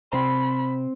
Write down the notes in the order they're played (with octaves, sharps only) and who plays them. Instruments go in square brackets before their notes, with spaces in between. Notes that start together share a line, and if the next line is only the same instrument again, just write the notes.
[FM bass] C3 [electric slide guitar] C4 C5 [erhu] B5